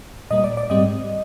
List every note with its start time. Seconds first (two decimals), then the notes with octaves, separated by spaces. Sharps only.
0.31 A#2 G3 A#3 D#5
0.44 D5
0.57 D5
0.70 G#2 G3 C4 D#5